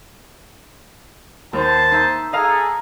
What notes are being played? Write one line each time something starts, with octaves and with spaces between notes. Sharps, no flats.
D#2 C5 A5
D#4 E5
G#4 A4 D#5 F5 A#5